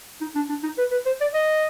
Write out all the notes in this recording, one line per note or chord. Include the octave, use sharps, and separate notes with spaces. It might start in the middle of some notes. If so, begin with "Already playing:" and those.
D#4
D4
D4
D#4
B4
B4
C5
D5
D#5